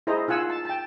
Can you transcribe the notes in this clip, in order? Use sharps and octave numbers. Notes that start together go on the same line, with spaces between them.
E4 G#4 C5 D#5 A#5
D#4 F4 F#5 G#5 E6
A5
G5 A5